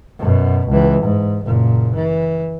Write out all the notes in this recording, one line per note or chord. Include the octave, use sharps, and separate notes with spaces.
F#2 B2
C#2 E3
G#2
F#1 A#2
E3